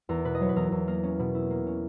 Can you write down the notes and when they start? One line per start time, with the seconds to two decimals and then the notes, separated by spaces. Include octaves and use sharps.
0.09 E2 A#4
0.25 B2 B4
0.35 D#5
0.40 F#3 C#5
0.49 B4
0.56 E2 A#4
0.72 E2
0.87 A#3 A#4
1.03 C#4
1.19 B2
1.35 E4
1.50 A#3
1.66 C#4